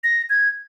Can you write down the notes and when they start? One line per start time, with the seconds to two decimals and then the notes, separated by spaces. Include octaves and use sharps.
0.04 A#6
0.30 G#6